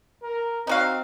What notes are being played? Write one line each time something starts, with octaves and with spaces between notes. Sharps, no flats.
A#4
C4 D#4 F#4 F5